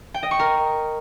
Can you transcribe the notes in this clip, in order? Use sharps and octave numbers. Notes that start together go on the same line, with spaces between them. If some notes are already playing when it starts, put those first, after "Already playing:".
G5
D#5
C#6
A#4